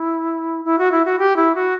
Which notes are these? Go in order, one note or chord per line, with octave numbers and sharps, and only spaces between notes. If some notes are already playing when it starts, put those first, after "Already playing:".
Already playing: E4
E4
F#4
E4
F#4
G4
E4
F#4